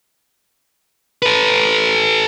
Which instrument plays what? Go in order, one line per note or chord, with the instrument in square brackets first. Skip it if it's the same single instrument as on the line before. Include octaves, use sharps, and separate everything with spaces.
[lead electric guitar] A4 B4